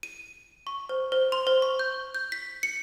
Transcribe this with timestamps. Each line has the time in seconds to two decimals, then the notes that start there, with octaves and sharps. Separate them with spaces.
0.03 D#7
0.67 C#6
0.89 C5
1.12 C5
1.32 C6
1.47 C5
1.62 C#6
1.79 G6
2.15 G6
2.32 B6
2.63 C#7